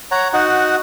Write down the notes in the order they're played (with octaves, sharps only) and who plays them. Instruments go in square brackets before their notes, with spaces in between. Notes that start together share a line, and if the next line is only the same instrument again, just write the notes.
[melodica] C#5 F#5 A#5
D#4 F#4 F#5